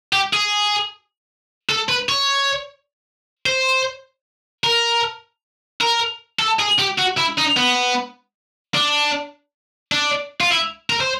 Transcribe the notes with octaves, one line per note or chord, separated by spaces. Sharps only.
G4
G#4
A4
B4
C#5
C5
A#4
A#4
A4
G#4
G4
F#4
E4
D#4
B3
D4
D4
F4
E4
A#4
C5